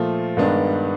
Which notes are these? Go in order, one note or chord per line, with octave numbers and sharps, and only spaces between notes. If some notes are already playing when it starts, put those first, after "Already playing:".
Already playing: A#2 F3 A3
G2 D#3 G#3 B3 D4